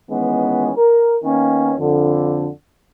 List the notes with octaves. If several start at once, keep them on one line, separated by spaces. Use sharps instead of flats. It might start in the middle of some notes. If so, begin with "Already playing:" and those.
D#3 E3 G#3 B3 C#4
A#4
D#3 A#3 B3 C#4
F2 D3